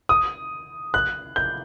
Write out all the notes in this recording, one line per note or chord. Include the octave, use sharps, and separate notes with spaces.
D#6
F#6
G6